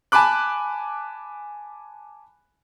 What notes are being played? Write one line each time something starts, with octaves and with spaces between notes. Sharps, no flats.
G#5 A5 B5 D6 F#6